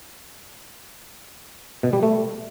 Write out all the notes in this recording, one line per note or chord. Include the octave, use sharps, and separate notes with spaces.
B2
G3
A3